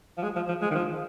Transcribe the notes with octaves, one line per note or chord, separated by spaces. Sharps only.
F3
G#3
F3
F3
G#3
D#3
F3